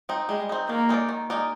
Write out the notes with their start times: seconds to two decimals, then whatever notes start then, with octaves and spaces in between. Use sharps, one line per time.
0.09 C4 D#4
0.29 G3 G#3
0.49 C4 D#4
0.69 D#3 A#3
0.89 G#3 D#4 A#4 D5
1.09 D#3
1.30 G#3 D#4 A#4 D5